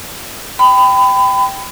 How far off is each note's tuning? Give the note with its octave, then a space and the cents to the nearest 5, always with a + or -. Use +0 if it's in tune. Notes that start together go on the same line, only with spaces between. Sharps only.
G5 +0 B5 +30